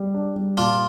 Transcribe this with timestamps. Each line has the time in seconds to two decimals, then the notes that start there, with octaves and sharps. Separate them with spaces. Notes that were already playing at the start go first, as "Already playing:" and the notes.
Already playing: G3
0.14 D4
0.36 G3
0.57 A#2 D4 F4